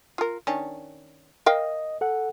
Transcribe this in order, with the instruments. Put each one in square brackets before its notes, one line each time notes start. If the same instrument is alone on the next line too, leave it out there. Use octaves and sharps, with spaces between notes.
[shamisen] F4 A#4
D#3 C#4 D4
[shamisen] A#4 F5 G5 [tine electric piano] D#5
[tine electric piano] A4 F#5